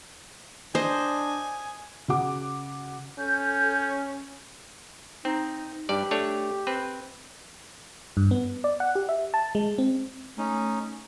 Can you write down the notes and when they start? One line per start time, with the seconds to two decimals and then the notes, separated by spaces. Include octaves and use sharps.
0.75 D4 C5 D#5 G#5
2.08 C#3 F#4 F#5 D6
3.19 C#4 A4 G6
5.25 C4 D#4
5.89 G2 G4 D5
6.11 A3 D4 C#5
6.67 C4 B4
8.17 G2
8.31 B3
8.64 D5
8.80 F#5
8.95 G4
9.09 E5
9.34 A5
9.55 G#3
9.78 C4
10.38 A3 C#4 D#4